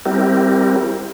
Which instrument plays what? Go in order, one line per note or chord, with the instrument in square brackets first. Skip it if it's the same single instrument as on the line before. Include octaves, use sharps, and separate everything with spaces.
[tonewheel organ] G3 C4 E4 G4 A#4